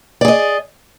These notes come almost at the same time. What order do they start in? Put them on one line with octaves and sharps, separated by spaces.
D5 G#4 D#5